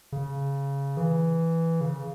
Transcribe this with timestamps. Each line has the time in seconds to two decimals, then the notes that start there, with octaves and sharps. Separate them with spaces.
0.12 C#3
0.97 E3
1.81 C#3